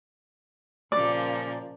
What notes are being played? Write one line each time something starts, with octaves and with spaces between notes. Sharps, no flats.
A#2 C#3 F3 A#3 D5 D6